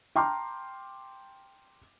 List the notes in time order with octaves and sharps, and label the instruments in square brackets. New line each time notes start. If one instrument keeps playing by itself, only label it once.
[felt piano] G5 A5 A#5 C6 D6 F6